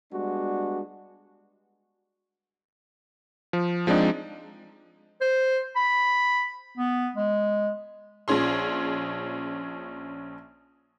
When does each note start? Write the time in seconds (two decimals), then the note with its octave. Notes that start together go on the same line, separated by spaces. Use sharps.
0.12 G3 G#3 B3 D4 F#4
3.53 F3
3.87 F3 G#3 C4 D4 D#4
5.21 C5
5.76 B5
6.77 B3
7.16 G#3
8.28 A#1 F3 C#4 G#4 C6